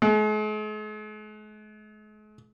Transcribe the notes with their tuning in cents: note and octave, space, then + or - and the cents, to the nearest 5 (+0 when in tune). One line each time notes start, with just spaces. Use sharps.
G#3 +45